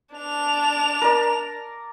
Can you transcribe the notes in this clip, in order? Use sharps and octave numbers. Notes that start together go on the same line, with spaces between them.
D4 F7
A#4 D5